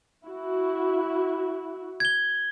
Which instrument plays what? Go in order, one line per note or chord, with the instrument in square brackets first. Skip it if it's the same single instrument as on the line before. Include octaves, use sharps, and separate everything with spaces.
[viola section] E4 F#4
[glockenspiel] G#6 G7